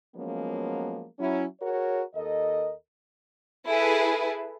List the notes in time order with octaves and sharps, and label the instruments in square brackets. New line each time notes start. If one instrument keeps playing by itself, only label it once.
[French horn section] F3 F#3 G#3 A#3 B3 C#4
F#3 C#4 E4
F#4 G#4 A#4 C#5
D#2 A4 A#4 D#5
[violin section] E4 G#4 A4 B4